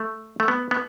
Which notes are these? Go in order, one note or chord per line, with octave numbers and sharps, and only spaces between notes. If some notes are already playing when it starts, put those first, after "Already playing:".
Already playing: A3
A3
B3
B3